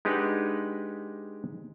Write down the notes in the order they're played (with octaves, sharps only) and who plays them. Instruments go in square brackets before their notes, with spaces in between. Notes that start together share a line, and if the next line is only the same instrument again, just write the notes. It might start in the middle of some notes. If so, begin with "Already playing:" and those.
[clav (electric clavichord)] G#3 D4 D#4 G4 B4 F#5